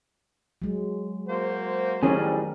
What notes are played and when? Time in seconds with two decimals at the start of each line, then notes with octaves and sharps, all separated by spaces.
0.62 F#3 G#3
1.28 A#3 F#4 C5
2.03 F2 A2 D#3 F#3 G3 C#4 G#4 A#4